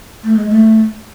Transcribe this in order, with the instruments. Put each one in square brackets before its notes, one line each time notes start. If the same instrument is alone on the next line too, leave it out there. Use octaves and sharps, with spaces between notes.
[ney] A3
G#3
A3